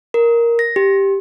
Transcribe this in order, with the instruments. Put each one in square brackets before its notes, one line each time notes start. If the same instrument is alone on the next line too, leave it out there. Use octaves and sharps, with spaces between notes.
[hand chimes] A#4
A#6
G4